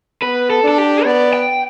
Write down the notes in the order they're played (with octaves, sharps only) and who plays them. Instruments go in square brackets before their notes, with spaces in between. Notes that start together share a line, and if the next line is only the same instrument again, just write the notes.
[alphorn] B3 [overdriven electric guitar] B4
[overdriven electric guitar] A4
[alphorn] D4 [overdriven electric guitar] A4
[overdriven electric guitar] G4
[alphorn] B3 [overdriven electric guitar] D5
[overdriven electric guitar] G5